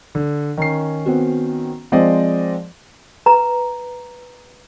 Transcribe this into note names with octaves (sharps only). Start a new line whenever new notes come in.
D3
D#3 C#4 C7
B3 C4 F#4
F3 G#3 C4 C5 D5 D#5
B4 A#5